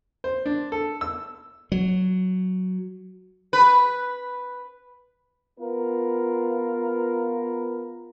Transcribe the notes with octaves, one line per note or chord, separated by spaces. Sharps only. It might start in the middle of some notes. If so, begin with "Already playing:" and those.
C5
D4
A4
E6
F#3
B4
B3 F4 A#4 B4